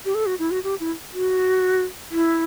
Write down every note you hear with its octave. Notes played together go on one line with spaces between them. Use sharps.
G4
A4
F#4
E4
F#4
G4
E4
F#4
E4